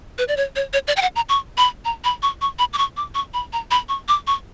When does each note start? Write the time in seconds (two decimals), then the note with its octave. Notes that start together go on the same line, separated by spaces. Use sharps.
0.18 B4
0.28 D5
0.37 C#5
0.56 C#5
0.73 C#5
0.88 D5
0.96 G5
1.02 F#5
1.16 A#5
1.29 C#6
1.57 B5
1.85 A#5
2.04 B5
2.23 C#6
2.42 C#6
2.59 B5
2.73 D6
2.78 C#6
2.97 D6
3.15 C#6
3.34 B5
3.53 A#5
3.71 B5
3.89 C#6
4.08 D6
4.27 C#6